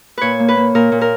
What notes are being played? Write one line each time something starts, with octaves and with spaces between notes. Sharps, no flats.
A#2 B4 C#5
A#3
B4
A#3
A#2 A#4
A#2
A#4